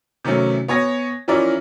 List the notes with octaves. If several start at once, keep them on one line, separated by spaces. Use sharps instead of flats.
C3 D#3 F#3 A3 C#4
B3 C#5 G#5 A#6
E3 F3 C#4 E4 A#4 D5